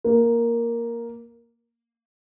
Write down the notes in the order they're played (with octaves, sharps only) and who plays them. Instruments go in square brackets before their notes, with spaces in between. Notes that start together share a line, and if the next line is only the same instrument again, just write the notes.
[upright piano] A#3